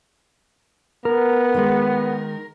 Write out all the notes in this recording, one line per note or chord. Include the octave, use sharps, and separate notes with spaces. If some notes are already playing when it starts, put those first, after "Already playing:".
B3 A#4
D#3 G#3